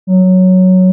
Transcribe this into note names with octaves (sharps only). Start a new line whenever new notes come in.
F#3